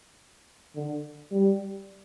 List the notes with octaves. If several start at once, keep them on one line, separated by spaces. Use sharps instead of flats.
D3
G3